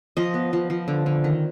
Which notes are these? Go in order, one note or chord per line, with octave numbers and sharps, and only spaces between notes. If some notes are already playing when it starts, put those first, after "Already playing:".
F3 D#5
B3
F3
F3
D3
D3
D#3